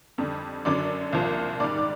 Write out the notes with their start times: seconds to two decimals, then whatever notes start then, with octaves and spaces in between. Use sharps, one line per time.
0.18 F2 D3 G3
0.65 F#2 D3 F#3 D5 D6
1.13 C2 A#2 F3
1.60 G#2 D#3 G3 D5 D6
1.77 D6